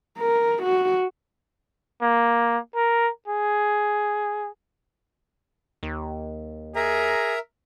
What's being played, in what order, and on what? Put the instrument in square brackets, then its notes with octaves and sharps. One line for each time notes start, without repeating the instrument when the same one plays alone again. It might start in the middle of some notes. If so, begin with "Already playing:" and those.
[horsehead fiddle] A#4
F#4
[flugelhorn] A#3
A#4
G#4
[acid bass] D#2
[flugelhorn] G#4 [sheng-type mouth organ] A#4 E5 A#5